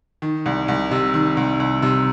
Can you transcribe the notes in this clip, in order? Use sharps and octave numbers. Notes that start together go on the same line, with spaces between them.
D#3
C2
C2
C3
D#3
C2
C2
C3